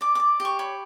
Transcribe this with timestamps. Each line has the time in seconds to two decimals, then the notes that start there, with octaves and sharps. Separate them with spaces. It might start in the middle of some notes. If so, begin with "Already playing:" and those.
0.01 D5 D6
0.15 D5 D6
0.40 G4
0.45 C#6
0.59 C#5 B5